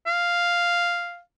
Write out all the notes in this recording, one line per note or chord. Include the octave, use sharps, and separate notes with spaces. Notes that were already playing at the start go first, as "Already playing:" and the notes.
F5